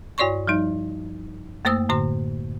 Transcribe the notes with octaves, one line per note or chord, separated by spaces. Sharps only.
G2 F#4 C#5 D5 C6 C#6
F3 G3 D#4
F#2 A3 A#3 C5 D#6 E6
A2 D3 C5 C6